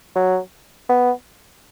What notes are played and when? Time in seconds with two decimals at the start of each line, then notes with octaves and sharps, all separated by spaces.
0.16 F#3
0.89 B3